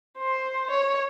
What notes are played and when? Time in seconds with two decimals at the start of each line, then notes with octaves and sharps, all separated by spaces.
0.18 C5
0.71 C#5